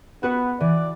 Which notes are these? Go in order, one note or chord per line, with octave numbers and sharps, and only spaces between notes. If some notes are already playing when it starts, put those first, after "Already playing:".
B3 F#4 B4 F#5
E3 D5